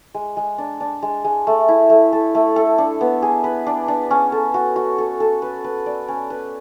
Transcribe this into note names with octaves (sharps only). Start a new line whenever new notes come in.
G#3
G#3
D4
D4
G#3
G#3
A3
E4
A3
A4
A3
A4
D4
B3
G#4
B4
D4
D4
C#4
A4
F#4
F#4
A4
A4
B4
B4
D5
C#4
B4